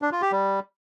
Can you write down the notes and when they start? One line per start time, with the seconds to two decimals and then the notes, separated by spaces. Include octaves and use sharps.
0.02 D4
0.12 F4
0.22 G4
0.32 G3